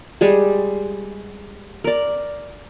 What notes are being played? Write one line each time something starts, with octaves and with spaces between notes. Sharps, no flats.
G3 G#3 G#4
A#4 D5